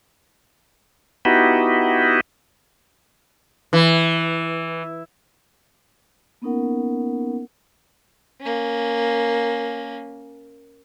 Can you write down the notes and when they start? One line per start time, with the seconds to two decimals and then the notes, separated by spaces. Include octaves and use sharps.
1.25 B3 D#4 E4 F#4 G4
3.73 E3
6.42 A#3 B3 C#4 D#4 A#4 F#5
8.41 A#3 C#4